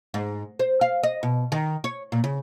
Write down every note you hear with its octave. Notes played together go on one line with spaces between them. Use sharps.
G#2
C5
F5
D#5
B2
D#3
C#5
A#2
C#3